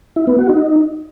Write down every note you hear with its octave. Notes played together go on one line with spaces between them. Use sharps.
E4
B3
F#4
D#4